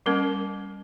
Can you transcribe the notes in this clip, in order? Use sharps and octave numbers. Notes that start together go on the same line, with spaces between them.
G3 A#3 C#4 A#4